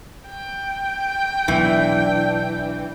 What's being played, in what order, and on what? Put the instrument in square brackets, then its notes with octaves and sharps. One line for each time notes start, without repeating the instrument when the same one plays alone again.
[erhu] G5
[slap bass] B1 B2 [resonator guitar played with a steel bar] E3 [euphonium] D4